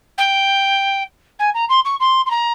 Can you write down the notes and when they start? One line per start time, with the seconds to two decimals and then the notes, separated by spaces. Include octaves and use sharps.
0.17 G5
1.39 G#5
1.54 A#5
1.69 C6
1.84 C#6
2.00 C6
2.26 C6
2.30 A#5